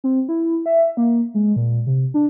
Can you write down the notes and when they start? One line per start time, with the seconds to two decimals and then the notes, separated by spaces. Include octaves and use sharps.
0.04 C4
0.29 E4
0.66 E5
0.97 A#3
1.34 G#3
1.56 A#2
1.87 C3
2.14 D4